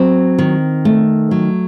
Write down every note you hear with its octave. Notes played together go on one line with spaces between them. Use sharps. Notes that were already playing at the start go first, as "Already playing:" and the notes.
Already playing: F#3 C4
D#3
A3
F#3